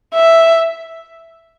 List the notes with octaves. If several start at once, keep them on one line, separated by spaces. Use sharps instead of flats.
E5